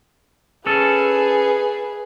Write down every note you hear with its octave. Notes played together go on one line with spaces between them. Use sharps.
C#4 G#4 A4 B4